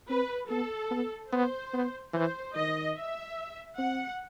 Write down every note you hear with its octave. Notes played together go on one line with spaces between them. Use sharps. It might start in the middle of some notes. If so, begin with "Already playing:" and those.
C4 B4
B3 A4
B3
B3 C5
B3
E3 C5
D#3 D#5
E5
C4 F#5